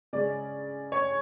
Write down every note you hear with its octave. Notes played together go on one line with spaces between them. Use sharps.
C#3 G#3 C#4 D5
C#5